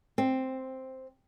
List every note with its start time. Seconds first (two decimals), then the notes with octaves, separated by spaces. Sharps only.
0.18 C4